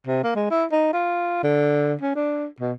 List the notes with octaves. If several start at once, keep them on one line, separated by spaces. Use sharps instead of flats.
C3
A#3
G#3
E4
D#4
F4
D3
C#4
D4
B2